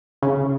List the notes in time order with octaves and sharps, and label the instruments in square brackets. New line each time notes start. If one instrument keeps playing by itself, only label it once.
[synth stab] C#3